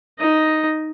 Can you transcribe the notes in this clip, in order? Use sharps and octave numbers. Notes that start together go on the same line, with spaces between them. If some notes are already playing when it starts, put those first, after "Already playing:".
D#4 D#5